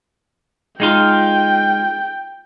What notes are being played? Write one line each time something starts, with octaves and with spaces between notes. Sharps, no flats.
G#3 D#4 F4 G5